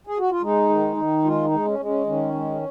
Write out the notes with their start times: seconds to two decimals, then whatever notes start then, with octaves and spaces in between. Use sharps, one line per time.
0.07 G#4
0.19 F#4
0.31 F4
0.42 G#3 D#4
0.69 D#3
0.97 D#3
1.24 G#3 F4
1.45 D#4
1.51 G#3
1.65 C#4
1.79 G#3
1.85 C#4
2.06 D#3 C#4
2.34 G#3